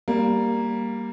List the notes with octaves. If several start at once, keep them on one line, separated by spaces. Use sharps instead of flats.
G3 A#3